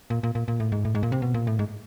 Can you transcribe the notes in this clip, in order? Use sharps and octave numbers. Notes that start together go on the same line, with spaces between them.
A#2
A#2
A#2
A#2
A2
G#2
A2
G#2
A#2
C3
B2
A#2
A2
G#2